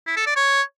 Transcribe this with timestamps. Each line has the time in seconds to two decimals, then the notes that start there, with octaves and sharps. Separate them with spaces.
0.07 E4
0.17 A4
0.27 D5
0.36 C#5